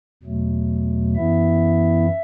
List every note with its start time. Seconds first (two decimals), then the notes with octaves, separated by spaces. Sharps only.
0.23 E2 B2 F#3 A3
1.16 F#2 E3 B3 E4 E5